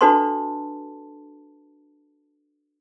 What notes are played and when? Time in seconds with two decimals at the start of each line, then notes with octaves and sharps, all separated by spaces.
0.01 D4 F#4 A4 B4 A5 C6